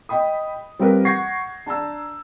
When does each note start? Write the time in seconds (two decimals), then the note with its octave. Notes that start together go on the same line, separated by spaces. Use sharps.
0.09 D#5 G5 B5 D#6
0.79 G3 C4 F4 A#4 B4
1.05 F#5 C#6 G6 G#6 A#6 C7
1.66 D4 A5 A#5 E6